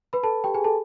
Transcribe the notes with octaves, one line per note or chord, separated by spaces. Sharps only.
B4 B5
A4 A5
G4 G5
G#4 G#5
A4 A5